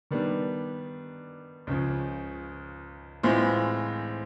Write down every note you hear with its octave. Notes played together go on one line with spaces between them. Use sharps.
D#3 G3 B3 D4
C#2 C#3 F3
A2 E3 G#3 C4 F4